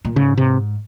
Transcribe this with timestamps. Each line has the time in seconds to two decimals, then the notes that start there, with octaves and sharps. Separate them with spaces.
0.05 A#2
0.16 G#2 C#3
0.38 C3